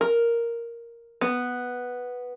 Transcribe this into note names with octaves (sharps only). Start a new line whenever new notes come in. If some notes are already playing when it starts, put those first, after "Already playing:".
A#4
B3